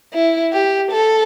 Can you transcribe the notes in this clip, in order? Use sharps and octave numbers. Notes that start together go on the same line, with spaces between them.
E4
G4
A4